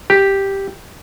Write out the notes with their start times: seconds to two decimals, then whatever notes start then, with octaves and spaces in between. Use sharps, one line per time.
0.10 G4